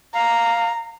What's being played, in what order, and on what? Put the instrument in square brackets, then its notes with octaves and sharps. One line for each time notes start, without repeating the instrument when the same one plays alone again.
[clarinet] F5 [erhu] A#5